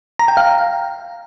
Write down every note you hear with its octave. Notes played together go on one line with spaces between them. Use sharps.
A#5
G5
F5